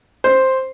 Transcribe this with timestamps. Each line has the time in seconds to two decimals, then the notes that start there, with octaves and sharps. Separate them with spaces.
0.24 C5